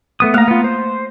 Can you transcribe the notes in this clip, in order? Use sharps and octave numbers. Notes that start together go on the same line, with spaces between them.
A3 B3 D#6
A3 A#3 F5 A#5
B3 F4
C5